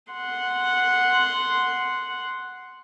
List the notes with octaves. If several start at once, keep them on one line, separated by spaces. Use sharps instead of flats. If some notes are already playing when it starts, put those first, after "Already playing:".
F#5 C6